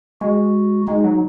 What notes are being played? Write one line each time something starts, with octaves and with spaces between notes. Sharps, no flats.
G#3 F#4
G#3 D#4
F#3